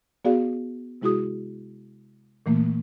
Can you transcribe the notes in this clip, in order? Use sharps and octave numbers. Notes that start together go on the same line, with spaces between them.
B3 F#4 G#4 D5 F5
C3 G#3 E4 F#4 G#4 D#6
A#2 E3 A3 A#3